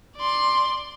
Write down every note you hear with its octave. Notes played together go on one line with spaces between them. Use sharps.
D5 C6